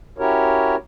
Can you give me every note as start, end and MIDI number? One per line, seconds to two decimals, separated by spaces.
0.18 0.76 61
0.18 0.76 64
0.18 0.76 66
0.18 0.76 67
0.18 0.76 70
0.18 0.76 73